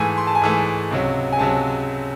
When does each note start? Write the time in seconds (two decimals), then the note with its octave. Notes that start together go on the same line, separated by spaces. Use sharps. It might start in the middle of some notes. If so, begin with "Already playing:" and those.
Already playing: G#2 E3 A3 G#5
0.17 C6
0.27 A5
0.35 G#5
0.42 G#2 E3 A3 A5
0.91 C#2 C3 F#3
1.32 G#5
1.39 C#2 C3 F#3 A5